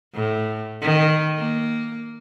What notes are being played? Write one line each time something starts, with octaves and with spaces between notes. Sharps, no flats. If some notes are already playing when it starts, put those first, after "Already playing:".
A2
D#3
A#3